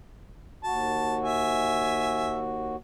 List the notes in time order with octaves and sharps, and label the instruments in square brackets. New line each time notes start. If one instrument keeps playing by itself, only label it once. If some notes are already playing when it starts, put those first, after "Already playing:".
[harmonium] D#2 F#4 [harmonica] A5
[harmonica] E5 G#5